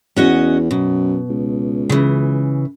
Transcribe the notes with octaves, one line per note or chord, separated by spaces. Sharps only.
E2 C#4 F#4 D#5
F#2 B2
C#2
C#3 E3